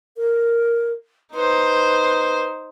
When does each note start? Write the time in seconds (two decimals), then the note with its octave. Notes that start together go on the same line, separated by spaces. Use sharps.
0.17 A#4
1.34 D#4 B4 C5